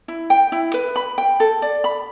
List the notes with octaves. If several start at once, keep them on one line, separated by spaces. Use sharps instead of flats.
E4
G5
E4
B4
B5
G5
A4
D5
B5